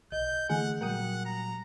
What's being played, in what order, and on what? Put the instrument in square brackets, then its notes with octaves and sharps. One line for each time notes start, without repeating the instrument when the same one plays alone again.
[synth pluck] B1 [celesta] D#5 [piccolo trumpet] G6
[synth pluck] D3 E3 A3 [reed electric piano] G#4 [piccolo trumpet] F#5 [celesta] G#5
[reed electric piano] A#2 F#3 G3 [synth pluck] A#4 G5 D#6 [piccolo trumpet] F#5
[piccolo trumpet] A#5